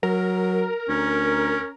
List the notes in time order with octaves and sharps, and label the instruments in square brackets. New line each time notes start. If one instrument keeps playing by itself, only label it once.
[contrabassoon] F#3 [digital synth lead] A#4
[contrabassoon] D2 [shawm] C#4